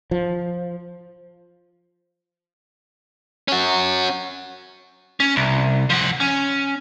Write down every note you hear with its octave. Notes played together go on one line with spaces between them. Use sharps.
F3
C#4 F#4
C#4
C2
F3 F#5
C#4